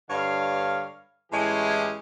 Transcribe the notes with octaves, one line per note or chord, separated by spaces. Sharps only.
G2 D3 C#5 F5
A2 E3 G#3 C#4 G4 G#5